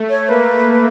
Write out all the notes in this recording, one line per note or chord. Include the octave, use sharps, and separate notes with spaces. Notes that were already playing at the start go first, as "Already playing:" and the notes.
Already playing: A3
C#5
A#3 B4